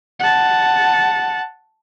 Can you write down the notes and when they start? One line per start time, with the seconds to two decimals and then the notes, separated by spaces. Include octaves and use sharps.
0.19 F#5 A5